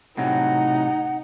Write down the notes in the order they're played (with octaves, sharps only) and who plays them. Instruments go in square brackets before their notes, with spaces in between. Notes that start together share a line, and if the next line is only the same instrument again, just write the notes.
[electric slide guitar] A2 C3 F#3 [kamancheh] D#4 [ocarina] F#5